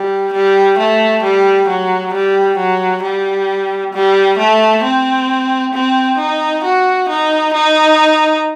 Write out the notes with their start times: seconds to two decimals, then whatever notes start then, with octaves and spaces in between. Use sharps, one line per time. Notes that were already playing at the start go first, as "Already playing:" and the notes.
Already playing: G3
0.33 G3
0.78 A3
1.23 G3
1.68 F#3
2.13 G3
2.57 F#3
3.03 G3
3.93 G3
4.38 A3
4.83 C4
5.73 C4
6.18 D#4
6.64 F#4
7.09 D#4
7.53 D#4